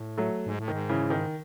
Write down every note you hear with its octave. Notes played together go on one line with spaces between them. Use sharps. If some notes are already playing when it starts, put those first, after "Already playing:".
Already playing: A2
F#3 A3
G#2
A2
G#2 D#3
C#3 E3
D#3